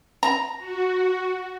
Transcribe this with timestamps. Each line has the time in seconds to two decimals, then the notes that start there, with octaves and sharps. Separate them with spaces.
0.23 A#5
0.58 F#4